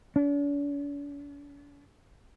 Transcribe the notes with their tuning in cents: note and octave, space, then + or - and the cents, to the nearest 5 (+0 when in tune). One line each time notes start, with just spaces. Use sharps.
D4 -45